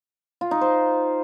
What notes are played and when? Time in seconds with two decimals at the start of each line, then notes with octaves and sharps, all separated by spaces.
0.41 F4
0.51 D#4
0.61 C5